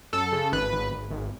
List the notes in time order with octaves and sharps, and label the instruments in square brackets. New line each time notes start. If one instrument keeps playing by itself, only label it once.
[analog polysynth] F#2 A4
C#3
G#1 B4
G#1
G#1
G#1